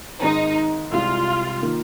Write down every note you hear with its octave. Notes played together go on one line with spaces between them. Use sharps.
G#1 G#2 G#3 D#4
C2 C3 G#3 F4
D#3 A#3 F4